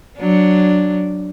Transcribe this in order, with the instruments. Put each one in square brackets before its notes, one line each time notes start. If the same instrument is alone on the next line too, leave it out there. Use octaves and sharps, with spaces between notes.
[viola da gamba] F#3 D4